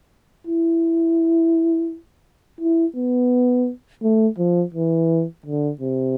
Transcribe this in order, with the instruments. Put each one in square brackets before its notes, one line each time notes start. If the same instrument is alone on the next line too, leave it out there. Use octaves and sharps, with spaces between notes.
[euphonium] E4
E4
B3
A3
F3
E3
D3
C3